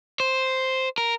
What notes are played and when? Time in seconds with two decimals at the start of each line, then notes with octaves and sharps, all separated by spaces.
0.20 C5
0.98 A#4